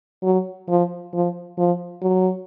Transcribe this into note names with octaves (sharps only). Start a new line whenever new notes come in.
F#3
F3
F3
F3
F#3